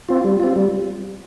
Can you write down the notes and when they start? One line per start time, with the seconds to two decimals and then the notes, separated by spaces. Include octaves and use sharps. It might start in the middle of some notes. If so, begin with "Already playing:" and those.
0.09 C4 F4
0.24 G3
0.40 C4 F4
0.56 G3